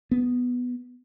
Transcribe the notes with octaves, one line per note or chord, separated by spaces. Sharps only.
B3